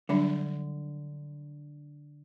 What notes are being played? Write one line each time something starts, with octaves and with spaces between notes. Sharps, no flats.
D3 F#3 G3 D4